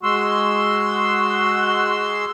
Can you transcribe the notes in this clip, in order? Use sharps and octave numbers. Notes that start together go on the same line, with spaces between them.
G#3 F#4 C6 E6